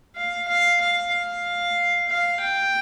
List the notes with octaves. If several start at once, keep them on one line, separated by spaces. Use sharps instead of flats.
F5
F5
F5
F5
F5
G5